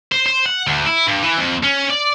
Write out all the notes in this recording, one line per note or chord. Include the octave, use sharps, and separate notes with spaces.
C5
C5
F#5
D2
E4
G2
E3
F2
C#4
D5